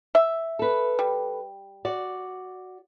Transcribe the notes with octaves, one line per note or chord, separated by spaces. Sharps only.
E5
A4 B4
G3
F#4 D5